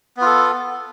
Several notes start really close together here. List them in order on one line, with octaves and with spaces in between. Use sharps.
B3 F4 A4